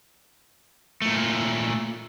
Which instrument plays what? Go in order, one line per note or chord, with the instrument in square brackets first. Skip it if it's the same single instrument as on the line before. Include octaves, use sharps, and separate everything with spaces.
[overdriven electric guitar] A#2 A3